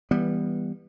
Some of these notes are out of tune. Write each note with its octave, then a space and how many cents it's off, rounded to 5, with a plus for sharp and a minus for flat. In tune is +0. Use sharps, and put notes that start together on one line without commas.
E3 +0 G3 +15 B3 -10